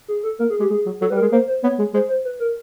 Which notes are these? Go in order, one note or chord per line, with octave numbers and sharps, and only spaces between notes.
G#4
A4
A#3 A#4
G#4
G#3 G4
G#3 G#4
F#3
F#3 A4
G3 B4
A#4
G#3
A#3 C5
C5
B3 C#5
G#3
G#3 C5
C5
B4
A#4